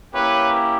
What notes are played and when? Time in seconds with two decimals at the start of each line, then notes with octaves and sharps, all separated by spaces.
0.13 A#3 C#4 E4 G4 B4 C#5